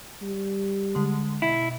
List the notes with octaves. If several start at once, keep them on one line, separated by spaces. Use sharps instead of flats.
G3
D3 G#3
B2 E4